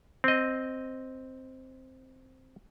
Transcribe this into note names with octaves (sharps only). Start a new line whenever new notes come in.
C4 D#5